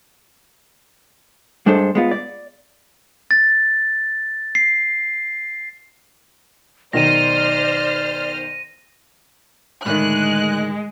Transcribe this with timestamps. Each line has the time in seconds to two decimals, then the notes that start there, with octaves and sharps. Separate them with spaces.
1.66 G2 G#3 D4 A4 C5
1.95 G#3 B3 F4
2.11 D5
3.31 A6
4.55 C7
6.93 B1 D#3 C5 D5 F6 A#6 D#7 E7
9.86 A2 D3 D#3 G#3 F#6